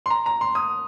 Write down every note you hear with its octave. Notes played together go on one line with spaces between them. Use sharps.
C6
A#5
A#5
C6
D#6